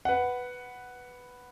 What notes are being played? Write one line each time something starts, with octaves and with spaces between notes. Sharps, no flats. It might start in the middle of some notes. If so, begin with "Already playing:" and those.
B4 F#5